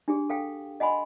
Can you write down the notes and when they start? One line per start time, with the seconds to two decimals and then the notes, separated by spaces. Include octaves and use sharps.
0.08 D4 G4 G#4
0.30 A4 F5 G5
0.80 D#5 F#5 G#5 B5 C6